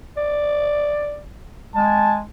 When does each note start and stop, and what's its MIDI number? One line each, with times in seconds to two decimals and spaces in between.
0.17 1.20 74
1.75 2.21 56
1.75 2.16 80
1.75 2.16 81